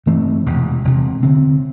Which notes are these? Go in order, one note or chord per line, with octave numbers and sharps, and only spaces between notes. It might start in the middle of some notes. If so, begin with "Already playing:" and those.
G2 E3 A3 C4
E1 E2 C3
E1 D2 C3
D2 D3 C4